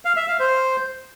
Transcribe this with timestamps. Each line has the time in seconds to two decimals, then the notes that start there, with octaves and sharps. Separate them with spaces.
0.05 F5
0.16 E5
0.28 F5
0.40 C5